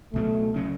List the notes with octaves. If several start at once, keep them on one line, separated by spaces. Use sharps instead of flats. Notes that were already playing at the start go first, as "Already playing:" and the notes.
C#2 B2 F#3 A3
C#3 F#3 C#4